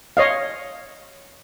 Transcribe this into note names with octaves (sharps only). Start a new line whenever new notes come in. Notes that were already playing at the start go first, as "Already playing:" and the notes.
C#5 D#5 F5